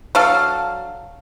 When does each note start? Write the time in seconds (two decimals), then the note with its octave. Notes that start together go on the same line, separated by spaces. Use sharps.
0.15 F#3 D4 A4 F5